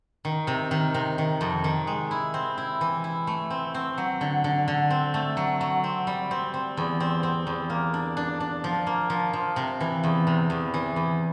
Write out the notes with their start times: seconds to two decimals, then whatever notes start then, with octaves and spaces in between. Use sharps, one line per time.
0.25 D#3
0.47 C3
0.71 D#3
0.94 C3
1.18 D#3
1.41 F2
1.64 D#3
1.87 G#3
2.11 E4
2.34 C4
2.58 E4
2.81 E3
3.04 E4
3.27 A3
3.50 C4
3.74 C4
3.98 F#3
4.21 D3
4.44 D3
4.68 D3
4.90 C4
5.14 A3
5.37 F#3
5.61 F#3
5.84 C4
6.07 G3
6.31 C4
6.54 C4
6.77 E2
7.00 C4
7.23 C4
7.47 E2
7.70 A#3
7.94 D4
8.17 D4
8.40 D4
8.64 F3
8.87 A#3
9.10 F3
9.33 F3
9.56 C3
9.81 E3
10.04 E2
10.27 C3
10.50 E2
10.74 E3
10.96 E2